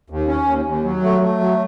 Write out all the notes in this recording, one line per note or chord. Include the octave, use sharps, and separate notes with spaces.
D#2
C#4
D#2
D#2
F#3
A3
A3
F#3